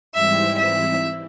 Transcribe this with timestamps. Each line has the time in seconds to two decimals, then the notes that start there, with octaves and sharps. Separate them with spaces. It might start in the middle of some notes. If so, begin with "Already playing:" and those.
0.14 G#2 E3 G3 C4 E4 E5
0.59 E5